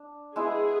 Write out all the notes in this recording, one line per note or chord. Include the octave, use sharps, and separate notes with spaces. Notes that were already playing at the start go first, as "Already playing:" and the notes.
Already playing: D4
G#3 B3 E4 G#4